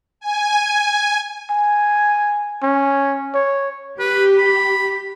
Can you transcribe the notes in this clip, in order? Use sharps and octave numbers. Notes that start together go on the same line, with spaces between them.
G#5
G#5
C#4
C#5
G4 B4
B5